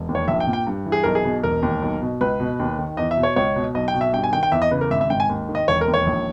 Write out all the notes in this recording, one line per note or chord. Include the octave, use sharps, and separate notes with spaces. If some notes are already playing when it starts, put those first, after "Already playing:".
Already playing: E1
D#2
C#5
A#1 E5
G5
A#2
G5
G2
E3
G#4
B1 A#4
G#4
B2
E1 A#4
D#2
B1
B2
C#2 B4
B2
D#2
D#3
E2 D#5
E5
B2
C#5
C#2 C#5
B2
B1 D#5
G5
B2
E5
G2 G5
G#5
D#3 G5
G5
E2 E5
D#5
C#3 B4
A#4
G#1 E5
E5
G#2 G5
G#5
D#2
D#3
D#5
E1 C#5
A#4
D#2
C#5
A#1